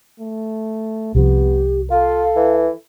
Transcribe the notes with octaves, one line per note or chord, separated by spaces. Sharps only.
A3
C2 C3 F3 B3 G4
F4 A4 F5
E3